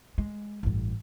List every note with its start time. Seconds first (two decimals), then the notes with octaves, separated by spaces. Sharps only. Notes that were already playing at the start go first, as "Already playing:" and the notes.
0.18 G#3
0.63 A1 G2